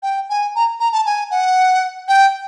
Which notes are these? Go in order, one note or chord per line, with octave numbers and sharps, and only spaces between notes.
G5
G#5
A#5
A#5
A5
G#5
F#5
G5